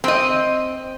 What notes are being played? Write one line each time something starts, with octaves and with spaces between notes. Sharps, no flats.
C4 D#5